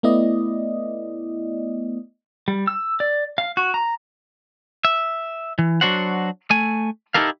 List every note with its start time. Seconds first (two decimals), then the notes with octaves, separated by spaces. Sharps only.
0.03 A3 B3 E4 D5 D#5
2.48 G3
2.67 E6
3.00 D5
3.38 F5
3.57 F#4
3.74 A#5
4.85 E5
5.59 E3
5.81 F#3 D4 F#4 C5 F#5
6.50 A3 G#5
7.14 D#4 E4 G4 A4 A#4 F5